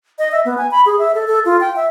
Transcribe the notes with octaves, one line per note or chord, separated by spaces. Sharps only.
D#5
E5
B3
G#5
B5
G#4
E5
A4
A4
F4
G5
E5